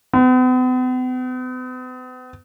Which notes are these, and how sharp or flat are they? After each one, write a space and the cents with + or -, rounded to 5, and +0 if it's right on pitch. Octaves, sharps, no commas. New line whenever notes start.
B3 +45